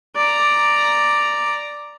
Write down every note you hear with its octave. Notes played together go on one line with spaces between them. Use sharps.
D5 A#5